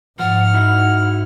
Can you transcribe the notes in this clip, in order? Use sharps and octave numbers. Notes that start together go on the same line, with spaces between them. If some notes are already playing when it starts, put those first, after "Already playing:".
G#2 F3 F#5 F6
D#4 E4 F#4